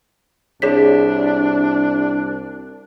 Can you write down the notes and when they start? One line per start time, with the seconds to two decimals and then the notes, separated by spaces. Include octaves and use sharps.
0.62 C2 D4 G#4 C#5 B6